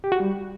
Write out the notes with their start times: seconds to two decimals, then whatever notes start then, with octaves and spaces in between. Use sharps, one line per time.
0.04 G4
0.12 F#4
0.20 G3